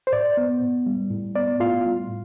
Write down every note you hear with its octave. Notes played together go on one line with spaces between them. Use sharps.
C5
A2 D5
B3
A2
G3
A2
B3 D5
A2 F4 F5
G3